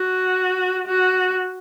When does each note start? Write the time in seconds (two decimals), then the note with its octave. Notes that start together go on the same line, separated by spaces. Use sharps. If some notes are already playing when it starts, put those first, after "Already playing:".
Already playing: F#4
0.87 F#4